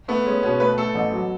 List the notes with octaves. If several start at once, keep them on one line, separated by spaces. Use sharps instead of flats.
A3 B3
G#3 C#4
B2 C#4
A3 B4
A3 A4
A1
F#3